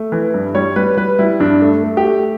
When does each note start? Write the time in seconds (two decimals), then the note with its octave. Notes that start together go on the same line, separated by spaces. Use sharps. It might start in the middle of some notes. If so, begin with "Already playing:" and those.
Already playing: A3
0.12 E3
0.34 G2
0.55 G3 C#5
0.76 G3 B4
0.97 G3 B4
1.19 G3 E4
1.40 G2 D4
1.62 A3
1.83 A3
1.97 G4
2.05 A3